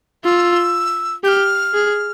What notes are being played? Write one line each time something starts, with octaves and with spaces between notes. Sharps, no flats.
F4 E6
G4 F6 G6
G#4